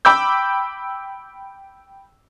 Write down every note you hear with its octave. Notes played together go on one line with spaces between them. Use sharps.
G5 B5 D6 E6 G6